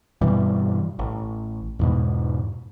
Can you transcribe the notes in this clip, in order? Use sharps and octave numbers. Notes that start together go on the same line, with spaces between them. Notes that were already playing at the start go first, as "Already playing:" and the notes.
G2 B2 E3 G3
A1
E2 G#2 B2